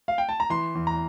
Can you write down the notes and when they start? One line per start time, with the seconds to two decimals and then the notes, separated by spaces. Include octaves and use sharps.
0.08 F5
0.18 G5
0.29 A5
0.40 A#5
0.50 E3 C6
0.75 E2
0.87 A#5